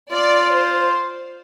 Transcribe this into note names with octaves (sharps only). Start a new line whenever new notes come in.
F4 D5
C5